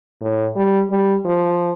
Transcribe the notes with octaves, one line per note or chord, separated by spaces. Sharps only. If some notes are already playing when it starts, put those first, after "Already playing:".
A2
G3
G3
F3